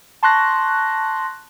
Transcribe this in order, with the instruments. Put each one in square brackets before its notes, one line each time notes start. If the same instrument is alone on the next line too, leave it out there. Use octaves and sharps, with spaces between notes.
[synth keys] A5 C6 C#6 F#6 A#6